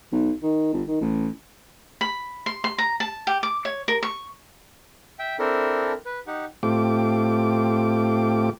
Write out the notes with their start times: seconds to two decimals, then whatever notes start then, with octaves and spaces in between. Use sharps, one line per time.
0.12 B1
0.42 D#3
0.73 G1
0.88 D#3
1.01 A1
2.01 B5
2.46 C6
2.64 C6
2.78 A#5
3.00 A5
3.27 G4
3.43 D6
3.65 C#5
3.88 A#4
4.03 C#6
5.19 E5 G5
5.39 C4 D4 E4 A4 A#4
6.06 B4
6.27 D#4 G4 F#5
6.63 A2 A3 C4 F4 G4 D6